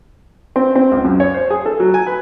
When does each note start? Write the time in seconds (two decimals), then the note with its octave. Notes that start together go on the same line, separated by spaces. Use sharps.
0.56 C4
0.75 C4
0.92 C#2
1.04 F#2
1.20 C#5
1.34 C5
1.50 G#4
1.66 A4
1.80 F#3
1.94 G#5
2.07 B4